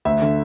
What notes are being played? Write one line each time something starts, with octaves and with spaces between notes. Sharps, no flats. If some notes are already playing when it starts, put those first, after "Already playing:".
D2 E5
D3